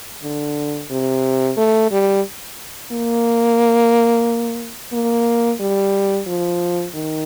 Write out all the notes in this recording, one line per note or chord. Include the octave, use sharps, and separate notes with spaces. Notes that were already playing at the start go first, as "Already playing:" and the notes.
D3
C3
A3
G3
A#3
A#3
G3
F3
D#3